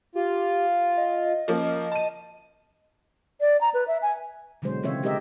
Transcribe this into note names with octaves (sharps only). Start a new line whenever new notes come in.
F4 G4
D#5
F3 A#3 C#4
A5 D#7
D5
A#5
B4
E5
G#5
B2 D3 F#3 G#3 C5
C#3 E3 C4 F4 C#5 E5
G#3 G4 A#4 D#5 E5